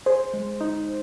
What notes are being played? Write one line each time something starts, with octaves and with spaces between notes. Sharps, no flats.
G#4 C5
G#3
D#4